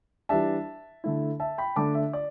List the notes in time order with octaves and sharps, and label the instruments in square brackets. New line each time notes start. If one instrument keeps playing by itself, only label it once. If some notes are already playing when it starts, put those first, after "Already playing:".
[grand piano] E3 G3 D4 E5 A5
D3 A3 E4
E5 A5
G5 B5
D3 A3 D4 A5 D6
E5
D5